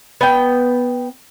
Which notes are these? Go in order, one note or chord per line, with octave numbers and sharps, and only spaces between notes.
B3 G5